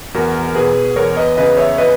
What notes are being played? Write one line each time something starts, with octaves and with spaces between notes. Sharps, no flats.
E2 F#4 A#4
B2 G#4 B4
E2 A#4 C#5
B4 D#5
C#3 B4 D#5
C#5 E5
B4 D#5